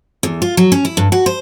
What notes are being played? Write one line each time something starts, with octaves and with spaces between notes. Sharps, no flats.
E2
F4
F#3
C#4
E4
G2
F#4
C5